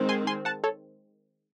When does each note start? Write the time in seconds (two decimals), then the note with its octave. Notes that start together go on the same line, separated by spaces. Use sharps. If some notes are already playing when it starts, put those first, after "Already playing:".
Already playing: D#3 G#3 C4
0.09 G#5 C6
0.27 G#5 C6
0.45 F#5 A5
0.64 A4 C#5